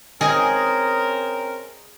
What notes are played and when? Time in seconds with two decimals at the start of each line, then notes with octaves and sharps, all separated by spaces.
0.21 C4 C#4 G#4 A#4 D#5 G#5